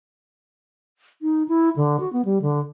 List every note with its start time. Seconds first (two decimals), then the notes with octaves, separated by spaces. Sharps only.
1.22 D#4
1.48 E4
1.76 D3
2.00 F#4
2.13 B3
2.25 G3
2.42 D3